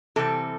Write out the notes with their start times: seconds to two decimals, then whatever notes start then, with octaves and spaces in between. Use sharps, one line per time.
0.16 C3 E3 G3 C4 A4